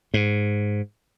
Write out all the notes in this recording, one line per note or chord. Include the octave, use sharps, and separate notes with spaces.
G#2